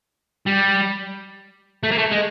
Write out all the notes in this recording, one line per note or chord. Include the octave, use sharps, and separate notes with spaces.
G3
A3
A#3
A3
G#3